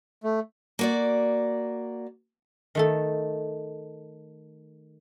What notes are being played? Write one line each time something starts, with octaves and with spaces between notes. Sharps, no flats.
A3
A#3 F#4 D5
D#3 A3 A4